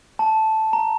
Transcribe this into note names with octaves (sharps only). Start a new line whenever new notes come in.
A5
A#5